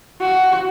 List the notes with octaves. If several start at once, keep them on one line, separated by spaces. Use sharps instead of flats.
F#4